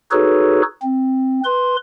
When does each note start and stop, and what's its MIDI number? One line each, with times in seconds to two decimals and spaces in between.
0.11 0.62 63
0.11 0.62 66
0.11 0.62 68
0.11 0.62 69
0.11 0.62 71
0.11 0.62 73
0.82 1.40 60
1.44 1.76 71
1.44 1.76 84